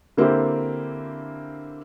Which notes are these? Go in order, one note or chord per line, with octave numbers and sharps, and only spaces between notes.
D3 A#3 C4 E4 G4 C5